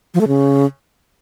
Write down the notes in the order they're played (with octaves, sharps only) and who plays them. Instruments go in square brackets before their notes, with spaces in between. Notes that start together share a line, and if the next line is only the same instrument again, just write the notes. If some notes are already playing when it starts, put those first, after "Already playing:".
[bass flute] F3
A3
C#3